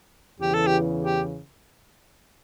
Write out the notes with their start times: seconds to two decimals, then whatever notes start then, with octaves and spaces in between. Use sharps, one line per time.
0.40 E2 C#3 E3 G4
0.54 A4
0.67 G4
1.03 G4